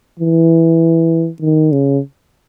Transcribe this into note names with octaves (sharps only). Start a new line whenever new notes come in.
E3
D#3
C#3